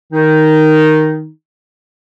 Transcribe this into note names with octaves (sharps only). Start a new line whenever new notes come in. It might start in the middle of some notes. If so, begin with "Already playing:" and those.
D#3 D#4